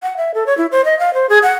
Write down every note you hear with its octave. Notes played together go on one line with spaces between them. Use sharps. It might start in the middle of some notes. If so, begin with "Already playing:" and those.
F#5
E5
A4
C#5
E4
C5
D#5
F5
C5
G#4
F#5